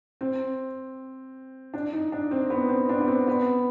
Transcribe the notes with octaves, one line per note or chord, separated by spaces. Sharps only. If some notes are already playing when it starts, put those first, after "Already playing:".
C4
D4
D#4
D4
C4
B3
C4
D4
B3
C4
B3